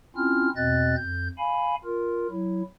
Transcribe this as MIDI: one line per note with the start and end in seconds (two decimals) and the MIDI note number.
0.16 0.49 60
0.16 0.49 61
0.16 0.49 64
0.16 0.49 65
0.16 0.49 89
0.56 0.95 40
0.56 0.95 47
0.56 0.95 60
0.56 0.95 75
0.56 0.95 90
0.56 0.95 93
0.96 1.28 41
0.96 1.28 91
1.38 1.75 77
1.38 1.75 80
1.38 1.75 83
1.85 2.27 65
1.85 2.27 70
2.30 2.62 54
2.30 2.62 64